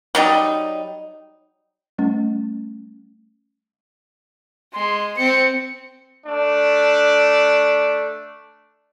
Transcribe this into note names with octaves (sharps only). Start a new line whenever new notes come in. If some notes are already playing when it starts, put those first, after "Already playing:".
F#3 G3 D#4
G3 A3 C#4
G#3 C6
C4 C#7
A3 D4